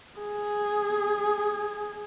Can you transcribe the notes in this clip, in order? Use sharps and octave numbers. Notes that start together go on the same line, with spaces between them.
G#4